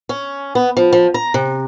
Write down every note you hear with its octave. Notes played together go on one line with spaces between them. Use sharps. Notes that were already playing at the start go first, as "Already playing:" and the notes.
C#4
B3
F3
F3
A#5
C3